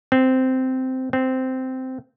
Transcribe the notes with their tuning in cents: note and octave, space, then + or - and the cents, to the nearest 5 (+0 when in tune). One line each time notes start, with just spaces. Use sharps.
C4 -10
C4 -10